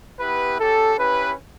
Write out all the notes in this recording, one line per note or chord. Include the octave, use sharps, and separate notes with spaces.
B3 E4 G4 B4
C#4 G4 A4
C#4 E4 G4 B4